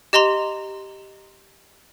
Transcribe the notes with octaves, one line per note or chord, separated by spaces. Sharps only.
G4 D#5 A#5 C6 F7